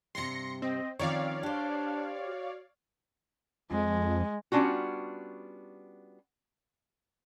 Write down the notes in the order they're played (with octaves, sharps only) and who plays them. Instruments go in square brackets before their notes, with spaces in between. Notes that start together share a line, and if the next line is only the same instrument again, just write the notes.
[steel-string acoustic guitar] G2 C3 [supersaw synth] C6 A#6 C#7
[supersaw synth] C4 [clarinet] D#5
[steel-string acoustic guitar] D#3 F3 C#4 [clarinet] C4 [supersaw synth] C#5 D5 F5
[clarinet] D4 [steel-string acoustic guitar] G4 C5
[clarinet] F#4
[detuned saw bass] F2 [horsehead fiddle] G#3
[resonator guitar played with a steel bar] G3 B3 C#4 D4 F4 F#4